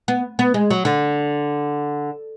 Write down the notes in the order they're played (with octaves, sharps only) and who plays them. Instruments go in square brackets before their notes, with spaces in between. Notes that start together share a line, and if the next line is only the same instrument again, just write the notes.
[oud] B3
B3
G#3
F#3
D3